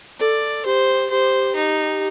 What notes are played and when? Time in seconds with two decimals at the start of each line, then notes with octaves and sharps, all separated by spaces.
0.20 A4 D5
0.65 G4 C5
1.11 G4 C5
1.56 D#4